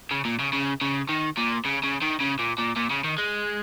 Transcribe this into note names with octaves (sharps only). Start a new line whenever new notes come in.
C#3
A#2
C#3
C#3
C#3
D#3
A#2
C#3
C#3
D#3
C#3
A#2
A#2
A#2
C#3
D#3
G#3